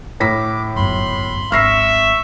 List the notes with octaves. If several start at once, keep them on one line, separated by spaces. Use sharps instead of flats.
A2 D6 A#6 B6
G1 F#2 B5 C6
G#1 E5 C#6 F6 A#6 C7